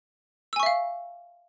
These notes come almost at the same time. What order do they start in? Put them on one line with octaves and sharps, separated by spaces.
E6 G#5 C#6 E5 F5